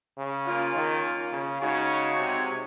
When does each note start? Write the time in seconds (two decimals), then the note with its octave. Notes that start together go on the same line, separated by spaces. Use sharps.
0.18 C#3
0.47 A#3 C#4 F4
0.75 D#3
1.33 C#3
1.62 C#3 G#3 D#4 F#4 C#5
2.20 C3